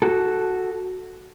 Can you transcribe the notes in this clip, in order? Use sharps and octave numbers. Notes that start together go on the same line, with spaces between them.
F#4 A4